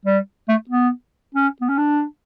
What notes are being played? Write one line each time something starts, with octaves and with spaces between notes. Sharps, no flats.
G3
A3
B3
C#4
B3
C#4
D4